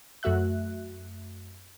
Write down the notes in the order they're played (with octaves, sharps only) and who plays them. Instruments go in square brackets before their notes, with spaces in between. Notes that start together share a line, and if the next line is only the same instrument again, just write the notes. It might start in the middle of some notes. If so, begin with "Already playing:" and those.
[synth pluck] F#2 A3 F#4 E5 F#6